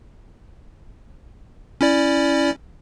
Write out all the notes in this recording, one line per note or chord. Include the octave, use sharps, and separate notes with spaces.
C#4 E4 D5